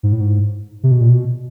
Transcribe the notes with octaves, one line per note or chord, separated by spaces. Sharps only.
G#2
A2
G#2
C3
B2
A#2
B2